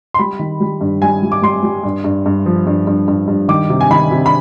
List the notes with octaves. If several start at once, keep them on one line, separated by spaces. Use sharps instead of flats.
C6
G3 B5
D#3
G3
G2
G3 G#5
G3
D6
G3 C6
G3
G2
G2
G2
F3
G2
G2
G2
G2
D#3 D6
C3
G#5
D#3 B5
C3
B5